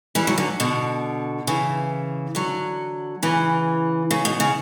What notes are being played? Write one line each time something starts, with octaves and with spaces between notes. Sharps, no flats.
E3 G3
D3 F#3
D3 F#3
B2 D3
C#3 E3
D3 F#3
C#3 E3
C#3
B2
C#3